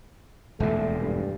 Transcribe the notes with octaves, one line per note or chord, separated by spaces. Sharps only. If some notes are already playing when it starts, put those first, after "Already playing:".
E1 D#2 A#2 A3
G2